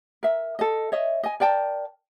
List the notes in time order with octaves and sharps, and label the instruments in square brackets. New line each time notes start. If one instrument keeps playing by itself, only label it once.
[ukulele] A#4 E5
A4 D#5
C#5 D#5 E5
D#5 G#5
A#4 D5 G5 A5